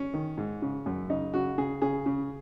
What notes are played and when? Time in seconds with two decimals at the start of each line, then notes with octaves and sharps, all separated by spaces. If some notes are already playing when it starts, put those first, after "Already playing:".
Already playing: C#4
0.14 D#3
0.37 G#2
0.62 C#3
0.86 F#2
1.10 C#3 D#4
1.34 C#3 F#4
1.58 C#3 G#4
1.82 C#3 G#4
2.06 C#3